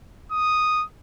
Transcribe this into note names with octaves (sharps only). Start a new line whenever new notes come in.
D#6